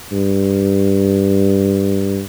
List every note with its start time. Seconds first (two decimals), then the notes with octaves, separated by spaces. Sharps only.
0.11 G2